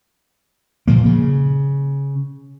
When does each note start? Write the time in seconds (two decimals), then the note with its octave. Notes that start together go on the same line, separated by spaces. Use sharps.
0.88 A#2 F3 A#3
1.06 C#3